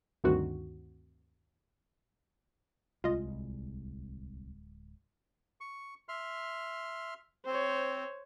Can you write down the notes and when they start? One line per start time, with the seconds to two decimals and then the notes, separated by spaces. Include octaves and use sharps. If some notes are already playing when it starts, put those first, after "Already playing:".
0.24 D2 G2 D#3 C4 F#4
3.04 D1 C2 G#3 F4 D#5
5.61 C#6
6.09 E5 C6 F6
7.46 C4 C5 C#5